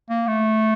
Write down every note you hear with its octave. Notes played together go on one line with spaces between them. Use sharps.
A#3
A3